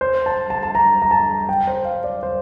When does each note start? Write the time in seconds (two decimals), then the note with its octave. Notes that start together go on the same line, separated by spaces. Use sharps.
0.01 C5
0.26 A5
0.50 A5
0.63 A5
0.75 A#5
1.02 A#5
1.11 A5
1.49 G5
1.67 C5
1.85 F5
2.04 D5
2.23 C5